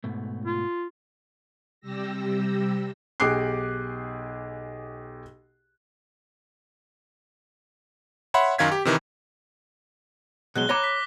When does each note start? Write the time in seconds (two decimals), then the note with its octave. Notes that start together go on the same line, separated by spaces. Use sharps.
0.04 G#2 B2 A3
0.46 F4
1.80 C3 G3 G4 E6 A#6
3.20 B1 G4 G#4 D6 F#6 C7
8.34 C#5 E5 F#5 B5 C6
8.58 F#2 D#3 F5 G#6 B6
8.72 G4
8.85 C3 D#3 E3
10.56 B2 F#3 G#3 F#6 G7
10.69 C#5 A#5 B5 D6 F#6 A#6
10.84 B6